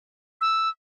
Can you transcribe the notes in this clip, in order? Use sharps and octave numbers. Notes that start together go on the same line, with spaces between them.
E6